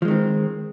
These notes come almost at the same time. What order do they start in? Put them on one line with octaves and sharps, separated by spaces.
F3 G#3 D#3 C4